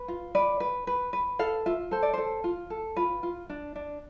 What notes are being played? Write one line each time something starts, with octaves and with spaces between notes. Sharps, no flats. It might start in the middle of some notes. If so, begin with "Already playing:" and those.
Already playing: B4
F4
B4 D5
B4
B4
B4
A4 F5
F4 E5
A4 C5
D5
A4 C5
F4
A4
F4 B4
F4
D4
D4